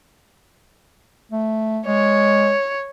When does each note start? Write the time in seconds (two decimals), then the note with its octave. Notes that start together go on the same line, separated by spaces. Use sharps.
1.32 A3
1.86 G#3 C#5